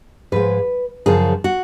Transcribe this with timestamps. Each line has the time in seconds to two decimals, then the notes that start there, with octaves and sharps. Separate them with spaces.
0.32 G#2 F3 G#3 B4
1.06 F#2 C#3 F3 G#4
1.44 F#4